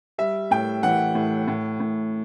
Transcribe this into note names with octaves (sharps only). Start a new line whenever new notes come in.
G3 E5
A2 G5
E3 F#5
A2
A2
A2